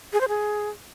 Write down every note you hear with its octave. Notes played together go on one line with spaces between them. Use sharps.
G#4
C5
G#4